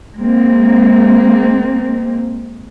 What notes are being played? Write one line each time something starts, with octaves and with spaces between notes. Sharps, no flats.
G#3 A#3 C4